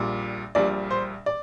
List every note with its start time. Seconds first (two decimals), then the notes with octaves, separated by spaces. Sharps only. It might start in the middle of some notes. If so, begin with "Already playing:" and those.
Already playing: A#1 A#2 G3
0.55 A#1 A#2 G3 D5
0.91 C5
1.26 D5